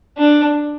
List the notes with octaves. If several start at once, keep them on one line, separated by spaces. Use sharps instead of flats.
D4